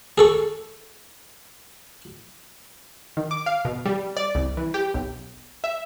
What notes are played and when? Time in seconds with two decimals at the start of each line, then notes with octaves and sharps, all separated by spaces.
0.18 G#4 A4 C#6
3.17 D#3
3.31 D6
3.46 F5
3.65 B2
3.86 G3
4.17 D5
4.35 C2
4.57 E3
4.74 G4
4.94 B1
5.64 E5